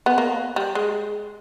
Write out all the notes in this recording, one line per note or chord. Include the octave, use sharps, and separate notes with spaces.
B3
A#3
G3
G#3